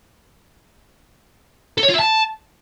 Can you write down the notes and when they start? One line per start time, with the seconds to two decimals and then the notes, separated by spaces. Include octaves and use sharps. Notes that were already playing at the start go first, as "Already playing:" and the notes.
1.78 A4
1.83 C#5
1.88 F4
1.94 E5
1.99 A5